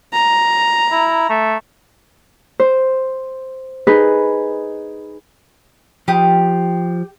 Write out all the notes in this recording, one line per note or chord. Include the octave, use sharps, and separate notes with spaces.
A#5
E4
A3
C5
D#4 G#4 B4
F3 G4 D#6